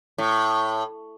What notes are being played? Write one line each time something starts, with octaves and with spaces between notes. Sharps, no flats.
A2